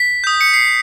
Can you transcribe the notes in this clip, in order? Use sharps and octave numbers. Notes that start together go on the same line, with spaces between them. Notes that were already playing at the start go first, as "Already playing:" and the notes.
Already playing: B6
D#6 G6
C#7
C7